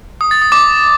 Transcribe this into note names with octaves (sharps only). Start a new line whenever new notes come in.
D#6
A6
D#6
D6